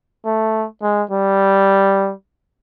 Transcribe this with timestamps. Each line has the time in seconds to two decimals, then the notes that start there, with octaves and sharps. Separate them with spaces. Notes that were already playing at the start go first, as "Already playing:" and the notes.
0.25 A3
0.82 G#3
1.11 G3